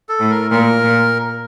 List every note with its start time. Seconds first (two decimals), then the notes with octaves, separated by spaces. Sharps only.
0.09 A4
0.20 A2
0.30 A#4
0.51 A#2 A#4
0.83 A#2